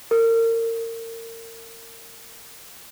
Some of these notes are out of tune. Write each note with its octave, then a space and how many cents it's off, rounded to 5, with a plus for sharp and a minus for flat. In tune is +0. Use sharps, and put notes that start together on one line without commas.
A#4 -35